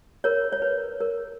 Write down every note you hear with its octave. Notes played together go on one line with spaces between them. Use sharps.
A#4 C#5
C#5
B4
A#4